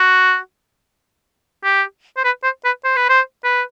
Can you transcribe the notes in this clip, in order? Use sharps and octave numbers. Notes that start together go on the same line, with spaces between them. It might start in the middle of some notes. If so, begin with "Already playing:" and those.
Already playing: F#4
G4
C5
B4
C5
B4
C5
B4
C5
B4